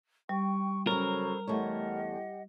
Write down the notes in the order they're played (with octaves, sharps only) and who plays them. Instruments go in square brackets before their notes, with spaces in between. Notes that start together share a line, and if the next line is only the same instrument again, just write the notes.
[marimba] G3 [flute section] G4 G5 C#6
[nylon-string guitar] C#3 F#3 [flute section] A4 C5 B5 [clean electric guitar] A#4
[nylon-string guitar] E2 A3 C#5 [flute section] G4 D#5 F#5